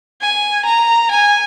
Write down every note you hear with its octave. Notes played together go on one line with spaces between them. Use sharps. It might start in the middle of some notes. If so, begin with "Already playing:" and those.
G#5
A#5
G#5